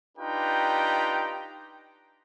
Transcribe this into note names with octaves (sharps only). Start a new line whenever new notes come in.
D4 D#4 F4 G4 B4 G5